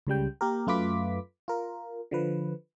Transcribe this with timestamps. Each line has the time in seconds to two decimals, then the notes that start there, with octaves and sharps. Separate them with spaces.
0.07 C#2 C#3 G3 G5
0.41 A#3 G4 A#4
0.67 F#2 A3 F4 B4 D6 B6
1.48 F4 A#4
2.11 D3 F3 B4